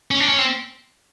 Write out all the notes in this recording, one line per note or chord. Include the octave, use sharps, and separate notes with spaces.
C#4
D4
C#4
C4